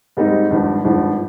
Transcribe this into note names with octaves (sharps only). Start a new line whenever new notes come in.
G#2 G3 C4 D#4
G#1 G2 F3
G#1 G2 F3